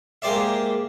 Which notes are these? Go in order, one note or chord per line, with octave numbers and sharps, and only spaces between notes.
G#3 A#3 G4 C5 D5 E5